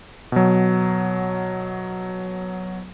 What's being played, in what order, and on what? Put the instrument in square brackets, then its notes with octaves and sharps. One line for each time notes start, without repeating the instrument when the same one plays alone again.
[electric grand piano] B2 F#3